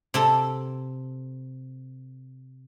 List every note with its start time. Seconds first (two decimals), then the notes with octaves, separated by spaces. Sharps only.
0.14 C3 C4 A4